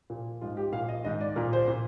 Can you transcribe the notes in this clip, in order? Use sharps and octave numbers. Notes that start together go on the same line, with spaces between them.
A#2 F3
G#2 F3 F4
G4
A#2 F3 F5
D#5
G#2 D#3 D#5
D5
A#2 F3 A#4
C5
A#2